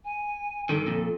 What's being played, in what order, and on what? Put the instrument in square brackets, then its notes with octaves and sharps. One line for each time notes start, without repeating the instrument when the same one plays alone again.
[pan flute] G#5
[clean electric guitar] G2 D3 D#3 [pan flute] A4
[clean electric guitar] F2 A#2